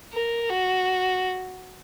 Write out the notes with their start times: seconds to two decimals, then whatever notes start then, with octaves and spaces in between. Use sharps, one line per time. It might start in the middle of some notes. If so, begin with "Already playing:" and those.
0.13 A#4
0.50 F#4